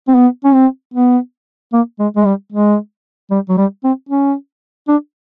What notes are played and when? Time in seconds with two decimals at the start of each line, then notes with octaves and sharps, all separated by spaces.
0.08 C4
0.15 B3
0.44 C#4
0.54 C4
0.94 B3
1.73 A#3
1.99 G#3
2.16 G#3
2.25 G3
2.52 G#3
3.31 G3
3.49 F#3
3.57 G3
3.84 C4
4.09 C#4
4.88 D4